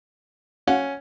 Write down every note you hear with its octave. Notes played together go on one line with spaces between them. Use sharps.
C#4 F#4 F5 F#5